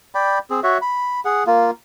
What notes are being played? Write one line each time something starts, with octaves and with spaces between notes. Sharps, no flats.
D5 G5 B5
C4 G#4
F#4 C#5 E5
B5
G#4 F#5
A#3 F4